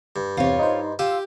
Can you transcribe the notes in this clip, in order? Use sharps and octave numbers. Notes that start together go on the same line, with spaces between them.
G2
E2 C3 F4 C#5
D#4 C5
F4 G4 E6